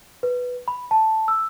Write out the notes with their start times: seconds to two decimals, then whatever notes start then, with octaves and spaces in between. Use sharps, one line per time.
0.23 B4
0.68 B5
0.91 A5
1.28 E6